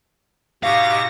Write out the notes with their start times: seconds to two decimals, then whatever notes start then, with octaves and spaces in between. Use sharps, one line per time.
0.63 G#2 B2 G4 F5 C#6 A#6